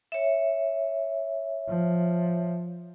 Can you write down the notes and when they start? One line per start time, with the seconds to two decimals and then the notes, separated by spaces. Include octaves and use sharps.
0.12 C#5 E5
1.68 F3